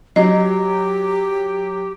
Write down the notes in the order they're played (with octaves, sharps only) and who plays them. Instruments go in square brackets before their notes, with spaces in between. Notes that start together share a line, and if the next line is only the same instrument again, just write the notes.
[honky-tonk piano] F#3 [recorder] G4 [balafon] D#5